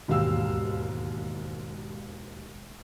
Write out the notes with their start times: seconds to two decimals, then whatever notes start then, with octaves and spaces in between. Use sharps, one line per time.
0.08 E1 D#2 G#2 G4 F5 E6